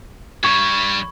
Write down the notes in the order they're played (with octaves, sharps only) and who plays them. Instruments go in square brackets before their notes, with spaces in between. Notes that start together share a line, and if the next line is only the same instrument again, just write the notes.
[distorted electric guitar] G2 G3 [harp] B5 C#6 G#6